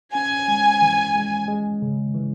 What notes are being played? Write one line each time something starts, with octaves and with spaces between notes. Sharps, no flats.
C#4 G#5
G#3
E3
G#3
G#3
C#3
E3